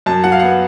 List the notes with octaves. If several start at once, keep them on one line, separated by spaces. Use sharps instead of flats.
F#2 A5
F#3 F#5
F5
B3 F#5